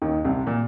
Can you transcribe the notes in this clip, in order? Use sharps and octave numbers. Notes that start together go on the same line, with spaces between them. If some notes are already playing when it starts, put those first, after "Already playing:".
D#2 D#3
C2 C3
A#2